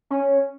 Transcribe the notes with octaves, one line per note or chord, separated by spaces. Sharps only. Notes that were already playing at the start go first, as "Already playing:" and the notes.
C#4